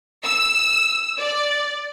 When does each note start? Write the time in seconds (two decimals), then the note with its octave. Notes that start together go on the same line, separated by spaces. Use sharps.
0.23 E6
1.19 D5